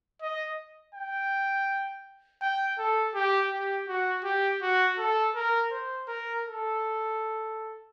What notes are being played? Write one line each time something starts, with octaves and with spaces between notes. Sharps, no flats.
D#5
G5
G5
A4
G4
G4
F#4
G4
F#4
A4
A#4
C5
A#4
A4